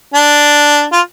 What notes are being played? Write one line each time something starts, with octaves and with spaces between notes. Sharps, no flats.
D4
F4